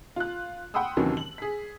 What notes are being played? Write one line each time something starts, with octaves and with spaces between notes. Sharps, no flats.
F4 F#6
F#5 G5 B5 C6 D#6 E6
D#2 C3 D#3 E3 F#3 C#4
F#7
G#4 B6